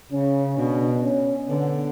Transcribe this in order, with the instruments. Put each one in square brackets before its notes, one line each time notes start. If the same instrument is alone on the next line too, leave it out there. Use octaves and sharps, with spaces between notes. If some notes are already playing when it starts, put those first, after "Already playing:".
[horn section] C#3 [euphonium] C#4
[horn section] B2 [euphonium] D4
[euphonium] C#4
[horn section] D3 [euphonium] B3